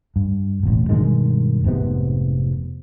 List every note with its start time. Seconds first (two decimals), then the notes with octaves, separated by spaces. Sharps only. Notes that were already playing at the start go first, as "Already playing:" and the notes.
0.16 G2
0.63 E1 A1
0.89 G2 B2 D#3 G#3
1.64 F1 G#2 C3 B3